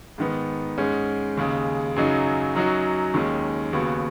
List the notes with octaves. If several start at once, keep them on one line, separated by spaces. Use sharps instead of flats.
G#2 D#3 B3
G#2 G#3 C#4
D#2 C#3 G#3
F#2 C#3 F#3 D#4
F#2 F#3 D#4 F#4
D#2 D#3 G#3 C#4
D#2 C#3 B3 F#4